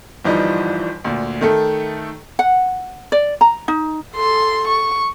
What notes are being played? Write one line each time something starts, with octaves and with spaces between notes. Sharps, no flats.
G1 E3 F3 G3 D#4
D2 A#2
D#3 A3 A4
F#5
D5
A#5
D#4
A4 C6
C#6